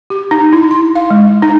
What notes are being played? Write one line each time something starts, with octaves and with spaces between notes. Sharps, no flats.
G4
D#4
E4
C6
F5
G#3
D#4